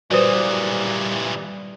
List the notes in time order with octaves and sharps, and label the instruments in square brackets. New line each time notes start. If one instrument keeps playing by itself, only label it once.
[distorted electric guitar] A#2 E3 [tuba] G3 [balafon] F#4 B4 C5 [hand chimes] D5 D#6